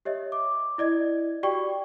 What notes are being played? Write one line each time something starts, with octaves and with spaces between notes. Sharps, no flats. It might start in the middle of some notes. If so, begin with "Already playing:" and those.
G4 C#5 D#5 E5
D6
E4 D5 D#5 G#6
F#4 G4 D5 G5 C#6